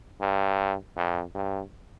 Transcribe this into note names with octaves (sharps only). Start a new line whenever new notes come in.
G2
F2
G2